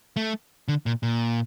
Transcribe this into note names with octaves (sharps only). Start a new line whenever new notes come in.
A3
D3
A#2
A#2